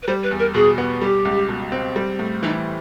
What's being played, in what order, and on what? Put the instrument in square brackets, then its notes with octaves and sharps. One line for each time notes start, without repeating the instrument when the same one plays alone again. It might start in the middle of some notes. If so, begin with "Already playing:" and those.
[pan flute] B4
[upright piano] G3 [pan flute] C5
[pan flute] B4
[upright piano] E2
[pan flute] A#4
[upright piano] B2 [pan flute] G#4
[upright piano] B3
[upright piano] G3 [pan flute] G4
[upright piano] C#2
B2
C4
G3
A2
[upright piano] E3 [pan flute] D#4